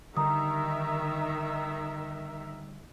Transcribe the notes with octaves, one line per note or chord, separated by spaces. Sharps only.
D3 D#3 G3 A#4 E5 A#5 D#6